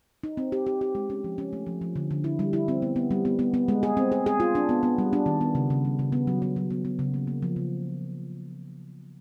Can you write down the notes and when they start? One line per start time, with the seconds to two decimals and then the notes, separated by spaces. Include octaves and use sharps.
0.24 D#4
0.37 C4
0.52 G4
0.66 G4
0.81 G4
0.95 G#3
1.10 C#4
1.24 F3
1.38 C#4
1.53 A3
1.66 F3
1.81 F3
1.96 D3
2.11 D3
2.24 E4
2.39 G3
2.53 E4
2.68 C4
2.82 B3
2.96 B3
3.11 G3
3.25 B3
3.39 B3
3.54 B3
3.68 G#3
3.83 G#4
3.97 C4
4.12 G#4
4.26 G#4
4.40 F4
4.55 D4
4.69 B3
4.83 B3
4.98 G3
5.13 D4
5.26 D#3
5.41 B3
5.55 C#3
5.70 C#3
5.85 G3
5.99 C#3
6.12 B3
6.27 F#3
6.42 B3
6.56 F#3
6.71 B3
6.85 B3
6.99 C#3
7.14 A#3
7.27 A#3
7.43 F3
7.56 C#3